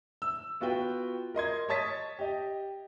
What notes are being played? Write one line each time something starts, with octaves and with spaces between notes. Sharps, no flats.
E6
B3 F4 F#4 B4 G5
A#4 D#5 C6 G#6
C#5 D#5 A5 D#6 A6 B6
G4 D#5